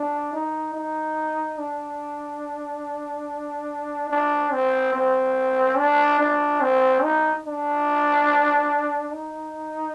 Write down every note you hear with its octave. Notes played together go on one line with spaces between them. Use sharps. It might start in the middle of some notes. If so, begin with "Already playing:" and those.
Already playing: D4
D#4
D#4
D4
D4
C4
C4
D4
D4
C4
D#4
D4
D#4